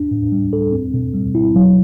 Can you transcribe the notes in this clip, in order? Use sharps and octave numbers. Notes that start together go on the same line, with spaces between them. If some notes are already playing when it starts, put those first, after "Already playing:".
Already playing: D4
A2
G3
A4
C4
B2
G3
E4
F#3